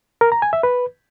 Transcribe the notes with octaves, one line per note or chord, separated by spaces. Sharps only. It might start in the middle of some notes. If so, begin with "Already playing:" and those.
A#4
A#5
G#5
E5
B4